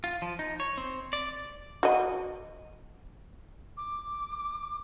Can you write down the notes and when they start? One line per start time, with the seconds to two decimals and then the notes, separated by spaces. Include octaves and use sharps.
0.04 F4
0.22 F3
0.39 D#4
0.60 C#5
0.77 C4
1.13 D5
1.83 F#4 D#5
3.77 D6